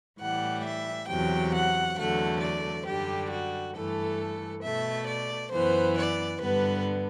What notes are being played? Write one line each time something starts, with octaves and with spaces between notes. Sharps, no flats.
A2 E3 G3 F#5
E5
E2 C3 F#3 G5
F#5
E2 D3 F#3 A3 F#5
D5
F#2 D3 G3 G4
F#4
G2 E3 A3 A4
B2 A3 E5
D5
F#2 E3 B3 C5
D5
G2 D3 G3 B3 B4